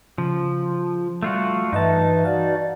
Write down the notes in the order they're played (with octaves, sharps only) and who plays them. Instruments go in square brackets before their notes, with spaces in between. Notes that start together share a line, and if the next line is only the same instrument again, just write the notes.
[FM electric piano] C#3 [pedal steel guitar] F3
[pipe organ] G3 [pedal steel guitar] A3 F4 F#4
[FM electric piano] G2 D#5 E5 [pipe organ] E3 B4 [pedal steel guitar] D#4 A5
[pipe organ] F#4 D5 [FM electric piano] F5 F#5